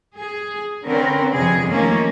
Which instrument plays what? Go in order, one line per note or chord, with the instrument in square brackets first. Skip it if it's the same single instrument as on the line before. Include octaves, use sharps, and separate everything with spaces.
[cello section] G#4
D3 C4 C#4 A#4 B4
F2 C3 F3 G#4
D#3 F3 A3 A#3 C#4